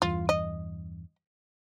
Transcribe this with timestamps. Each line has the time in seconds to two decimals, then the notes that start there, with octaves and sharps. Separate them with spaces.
0.02 E2 G2 F4
0.29 D#5